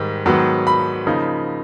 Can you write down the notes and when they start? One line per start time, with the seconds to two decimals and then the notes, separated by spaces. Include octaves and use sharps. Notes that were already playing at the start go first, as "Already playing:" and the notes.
Already playing: G#2 D#3 G3
0.26 G#2 D#3 F#3 B3
0.67 B5
1.06 C#3 F3 A#3 D#4